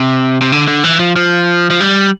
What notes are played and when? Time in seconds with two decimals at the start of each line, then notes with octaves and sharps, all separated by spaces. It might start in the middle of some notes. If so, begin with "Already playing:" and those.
Already playing: C3
0.41 C3
0.52 D3
0.68 D3
0.84 E3
1.00 F3
1.16 F3
1.70 F3
1.80 G3